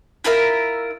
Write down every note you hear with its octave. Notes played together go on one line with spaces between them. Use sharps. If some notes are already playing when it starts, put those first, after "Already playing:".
E4 F4 A#4 E5